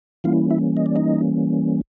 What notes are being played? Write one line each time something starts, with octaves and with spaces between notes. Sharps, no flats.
E3 G3 A#3 C#4 E4 F4 F5
E4 E5
D#5
D5
D#4 D#5